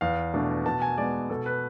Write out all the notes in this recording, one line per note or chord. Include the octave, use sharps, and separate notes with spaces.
E2 F5
B2 A3 D4
B2 A5
G#5
G#3 B3 D5
B2 A4
B4